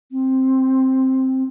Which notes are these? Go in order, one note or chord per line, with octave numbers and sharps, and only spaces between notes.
C4